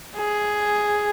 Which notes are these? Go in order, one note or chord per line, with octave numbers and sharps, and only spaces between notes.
G#4